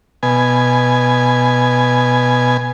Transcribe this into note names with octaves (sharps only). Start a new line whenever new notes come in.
B2 G#5